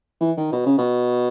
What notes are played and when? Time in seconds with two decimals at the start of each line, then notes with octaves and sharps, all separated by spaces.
0.21 E3
0.37 D#3
0.52 B2
0.66 C#3
0.78 B2